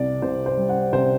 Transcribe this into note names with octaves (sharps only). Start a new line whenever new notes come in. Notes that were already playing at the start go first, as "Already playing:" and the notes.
Already playing: C2 C3 D5
C2 C5
C5
G3
F#5
C3 C5